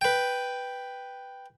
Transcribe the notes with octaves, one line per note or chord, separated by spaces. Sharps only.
B4 G5